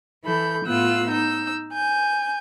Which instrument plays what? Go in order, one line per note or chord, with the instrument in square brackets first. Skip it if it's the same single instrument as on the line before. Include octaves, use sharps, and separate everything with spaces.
[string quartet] E3 A4 B5 G6
A2 B3 F4 E6 F#6
D#4 E6 G6
G#5 G6